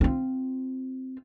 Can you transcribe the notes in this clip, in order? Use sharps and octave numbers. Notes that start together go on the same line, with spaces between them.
C4 F4